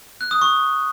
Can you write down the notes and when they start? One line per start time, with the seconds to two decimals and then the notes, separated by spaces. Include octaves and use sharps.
0.21 F#6
0.31 D#6
0.42 C#6